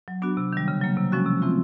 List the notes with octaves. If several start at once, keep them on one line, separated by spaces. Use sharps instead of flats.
F#3
B3 D4 F#4
C3
D#3 G3
C#3
F#3 A#3
C3
F3 G#3 C#4 F#4
C3
E3 A3 C4 F4